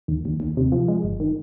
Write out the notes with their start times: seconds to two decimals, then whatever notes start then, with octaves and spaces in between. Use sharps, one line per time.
0.08 D#2
0.25 D#2
0.40 D#2
0.57 C3
0.72 F3
0.88 G#3
1.04 G1
1.20 D#3